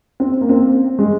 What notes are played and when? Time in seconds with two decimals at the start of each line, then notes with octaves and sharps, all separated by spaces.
0.20 C4
0.41 A#3
0.49 C4
0.99 G#3